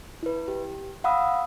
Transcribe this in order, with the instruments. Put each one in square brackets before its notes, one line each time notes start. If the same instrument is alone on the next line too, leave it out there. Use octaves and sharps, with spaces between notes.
[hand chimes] E4 B4
G4
F5 F#5 B5 D#6 E6